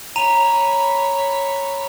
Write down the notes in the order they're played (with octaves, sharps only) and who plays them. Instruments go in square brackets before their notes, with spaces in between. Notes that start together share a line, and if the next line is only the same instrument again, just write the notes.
[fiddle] C#5 B5 [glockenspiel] A#5 D#7 F7